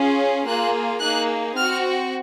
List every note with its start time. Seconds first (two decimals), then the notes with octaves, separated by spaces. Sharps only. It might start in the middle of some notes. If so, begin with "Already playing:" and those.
Already playing: C#4 F4 G#4
0.46 A#3 F4 G#4 F#6
1.01 A#3 D#4 G#4 F#6
1.56 C4 F#4 F6